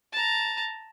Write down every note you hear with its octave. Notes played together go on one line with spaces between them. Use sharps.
A5 A#5